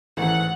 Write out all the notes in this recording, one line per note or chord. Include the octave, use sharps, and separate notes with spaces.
A1 G#2 E3 A3 F#5